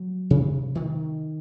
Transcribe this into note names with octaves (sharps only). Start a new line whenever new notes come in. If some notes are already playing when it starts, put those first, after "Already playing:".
Already playing: F#3
C3
D#3